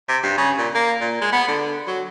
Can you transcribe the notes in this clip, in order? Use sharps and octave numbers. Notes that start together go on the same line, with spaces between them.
C3
G2
C#3
A#2
A#3
A#2
G#3
B3
D3
F#3